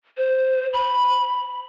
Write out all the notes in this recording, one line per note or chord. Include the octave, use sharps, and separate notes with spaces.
C5
B5